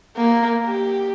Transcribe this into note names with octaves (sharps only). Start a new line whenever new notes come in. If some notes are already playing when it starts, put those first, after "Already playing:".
A#3
G4